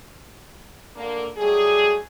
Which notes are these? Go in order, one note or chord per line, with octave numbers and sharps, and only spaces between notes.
D3 A#3
F#3 G3 A3 G#4